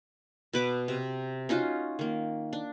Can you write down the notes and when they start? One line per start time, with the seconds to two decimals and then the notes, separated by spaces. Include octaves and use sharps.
0.53 B2 B4 D6
0.88 C3
1.49 C#4 D#4 F4 F#4
1.99 D#3 A#3
2.53 D4